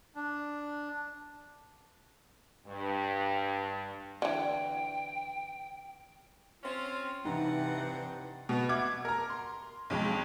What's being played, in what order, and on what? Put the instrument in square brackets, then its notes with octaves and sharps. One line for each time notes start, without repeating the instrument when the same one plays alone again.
[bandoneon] D4
[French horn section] G2
[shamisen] D3 E3 [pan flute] G5
[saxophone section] C4 C#4 [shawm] F4
[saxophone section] G2 C4 G4 [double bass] C3 E3 [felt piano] D#4 [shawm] F#5
[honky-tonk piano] B2 B3
E5 F#5 D6 G#6
A#4 A#5
C6
B1 F2 G#3